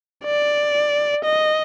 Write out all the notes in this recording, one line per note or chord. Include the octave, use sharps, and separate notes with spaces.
D5
D#5